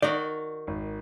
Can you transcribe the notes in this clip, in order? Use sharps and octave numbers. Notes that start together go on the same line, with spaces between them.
D#3 F#4 D5
G#1